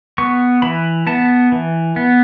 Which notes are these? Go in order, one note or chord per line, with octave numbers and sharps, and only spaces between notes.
B3 C#6
E3 B5
B3 A5
E3
B3